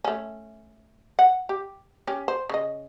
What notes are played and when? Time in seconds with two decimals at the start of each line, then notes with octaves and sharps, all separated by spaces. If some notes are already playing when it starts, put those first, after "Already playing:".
0.04 A3 C#4
1.19 F#5
1.49 G4
2.07 C#4 G4
2.28 C5
2.49 C#3 D#5